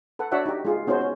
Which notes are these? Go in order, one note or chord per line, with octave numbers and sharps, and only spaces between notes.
A4 B4 F#5
D4 F#4 C#5 D5 E5 F#5
D#4 G4
G#3 F4 G#4
B3 C#4 D#4 F#4 C5
C#4